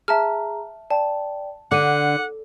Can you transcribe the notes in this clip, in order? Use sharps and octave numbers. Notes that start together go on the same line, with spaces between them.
G#4 E5 A5 A#5 F6
D5 G5 A5
D3 F#5 D6 C#7 D#7